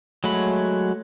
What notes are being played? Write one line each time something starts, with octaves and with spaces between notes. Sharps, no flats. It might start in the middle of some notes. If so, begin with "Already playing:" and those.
F#3 G#3 A3 B5